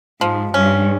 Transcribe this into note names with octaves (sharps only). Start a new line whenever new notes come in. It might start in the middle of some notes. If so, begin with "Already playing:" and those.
G#2 F3
G2 C#4